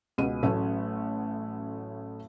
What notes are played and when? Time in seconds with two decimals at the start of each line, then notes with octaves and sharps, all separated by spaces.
0.18 C#2 B2 D#7
0.43 A1 F#3 A3 C#4 C#5